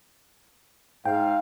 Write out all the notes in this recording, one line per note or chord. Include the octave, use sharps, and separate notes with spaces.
G#2 F5 G5